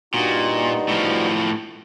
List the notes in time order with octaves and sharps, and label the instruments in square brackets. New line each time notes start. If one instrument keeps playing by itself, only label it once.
[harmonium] G2 D#4 F#4 [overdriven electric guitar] A#2
[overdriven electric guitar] A2 F3